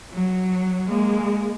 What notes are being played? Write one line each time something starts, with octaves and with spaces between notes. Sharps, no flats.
F#3
G#3 A#3